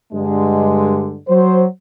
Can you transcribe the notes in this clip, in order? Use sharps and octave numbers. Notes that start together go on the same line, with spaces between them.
G2 D3 G#3
F#3 C5